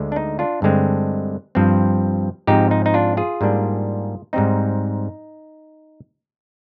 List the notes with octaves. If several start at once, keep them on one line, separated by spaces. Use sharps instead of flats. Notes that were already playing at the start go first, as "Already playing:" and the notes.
Already playing: D2 D3 G#3
D4
D#4
D4 F4
G2 D3 G#3 C4
G2 F3 C4
G#2 F3 C4 D#4 G4
D#4
D#4
D4 F4
F4 G#4
G#2 G3 A#3 D4
G#2 G3 C4 D#4